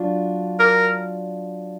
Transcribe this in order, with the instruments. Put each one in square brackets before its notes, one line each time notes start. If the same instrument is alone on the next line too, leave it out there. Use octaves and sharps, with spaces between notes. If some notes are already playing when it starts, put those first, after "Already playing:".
Already playing: [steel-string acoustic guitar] F#3 D4 F4
[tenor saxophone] A#4